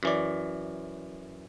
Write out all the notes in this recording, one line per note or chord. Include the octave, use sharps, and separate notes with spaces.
F#2 E3 D5